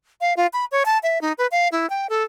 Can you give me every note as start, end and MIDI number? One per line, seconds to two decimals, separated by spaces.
0.21 0.33 77
0.37 0.47 65
0.53 0.65 83
0.72 0.83 73
0.85 0.98 81
1.03 1.21 76
1.21 1.33 63
1.38 1.47 71
1.51 1.68 77
1.72 1.89 64
1.90 2.07 79
2.10 2.23 69